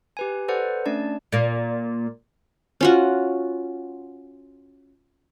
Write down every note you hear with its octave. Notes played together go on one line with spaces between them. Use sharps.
G4 B4 G#5
A4 B4 C5 D5 F#5
A3 C#4 D4 D5 A5
A#2 A#3
C#4 F4 F#4